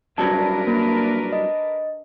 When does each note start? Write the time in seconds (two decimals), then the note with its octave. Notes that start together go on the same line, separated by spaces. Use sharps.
0.18 C2 G2 F#3 D4 A#4 B4 A5
0.67 A#3
1.33 D#5